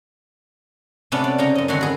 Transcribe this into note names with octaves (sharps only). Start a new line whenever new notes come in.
C3 A3 B3 C#4 D4
D5
C#3 C#4 D#4 C#5 A#5
F#2 D#5
D3 D#3 C4 F#4 G#4 C#5
G#4 B4